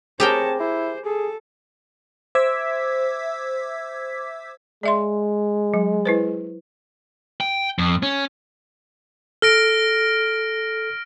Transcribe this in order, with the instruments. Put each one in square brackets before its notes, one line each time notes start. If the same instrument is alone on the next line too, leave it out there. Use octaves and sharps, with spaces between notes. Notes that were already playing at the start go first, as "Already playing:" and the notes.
[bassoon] C4 [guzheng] G4 A#4 G5 [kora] G#4 [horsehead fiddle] C#5 A5
[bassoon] E4 [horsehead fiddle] C5
[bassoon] G#4 [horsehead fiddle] A4
[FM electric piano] C5 E5 D6 E6 G#6 B6
[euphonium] G#3 [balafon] D5 E5 C6
[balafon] F#3
E4 B4 C5
[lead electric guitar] G5
F2
C#4
[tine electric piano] A4 [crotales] F6 A#6 D7